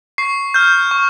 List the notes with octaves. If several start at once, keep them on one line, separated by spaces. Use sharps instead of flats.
C#6 C7
F6 G6
C#6